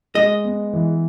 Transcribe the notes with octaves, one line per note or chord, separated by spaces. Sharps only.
G#3 D#5
B3
E3